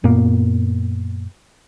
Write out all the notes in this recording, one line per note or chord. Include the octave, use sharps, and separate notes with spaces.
F#2 A#2 A#3 B3